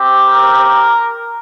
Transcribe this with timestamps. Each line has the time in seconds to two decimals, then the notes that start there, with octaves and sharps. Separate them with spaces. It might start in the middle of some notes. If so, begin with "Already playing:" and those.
Already playing: C4 G4
0.26 A#4